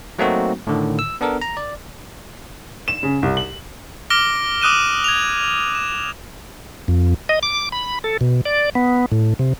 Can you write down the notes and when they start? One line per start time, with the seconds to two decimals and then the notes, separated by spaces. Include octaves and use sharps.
0.19 F#3 A3 A#3 C4 D#4 F#4
0.67 A2 D3 D#3
0.99 E6
1.21 B3 D4 A4 A#4
1.42 A#5
1.57 D5
2.88 E7
3.03 C#3
3.22 C2
3.37 F#7
4.10 D6 F6 A#6 D7 G7
4.62 D6 D#6 F#6 D#7 E7
5.04 G#6 F7
5.75 E7
6.88 F2
7.29 D#5
7.43 D6
7.72 B5
8.04 A4
8.21 B2
8.45 D5
8.75 B3
9.12 A2
9.39 C3